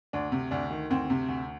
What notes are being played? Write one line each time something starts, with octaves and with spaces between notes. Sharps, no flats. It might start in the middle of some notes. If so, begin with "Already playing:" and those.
D2 D4
C3
D2 D4
D#3
D2 C4
C3
D2